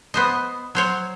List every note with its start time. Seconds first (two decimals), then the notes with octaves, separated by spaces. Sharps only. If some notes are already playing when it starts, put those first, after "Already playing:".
0.14 B3 C5 D#5
0.75 F#3 C5 C#5